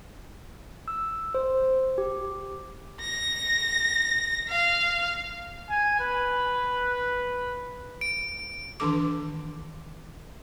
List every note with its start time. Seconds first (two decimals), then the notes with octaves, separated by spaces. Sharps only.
0.88 E6
1.34 C5
1.98 G4
3.01 A#6
4.49 F5
5.70 G#5
6.00 B4
8.01 D7
8.80 D#3 E3 D4 A4 D6